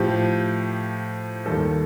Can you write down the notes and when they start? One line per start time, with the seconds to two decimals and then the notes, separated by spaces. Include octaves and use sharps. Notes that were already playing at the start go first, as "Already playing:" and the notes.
Already playing: A2 F3 G4
1.46 D#2 D#3 G3 A4